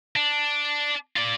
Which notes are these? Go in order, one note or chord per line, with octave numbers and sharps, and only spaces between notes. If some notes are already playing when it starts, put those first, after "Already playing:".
D4
F4 D5